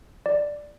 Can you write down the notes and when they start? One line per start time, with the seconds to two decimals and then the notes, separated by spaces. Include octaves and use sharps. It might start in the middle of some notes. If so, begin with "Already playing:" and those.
0.26 D5